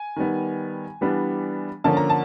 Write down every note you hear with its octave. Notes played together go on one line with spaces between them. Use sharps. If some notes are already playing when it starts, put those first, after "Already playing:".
Already playing: G#5
D#3 G3 B3
E3 G3 B3 D4
D3 F3 A#3 C#4 A5
A#5
A5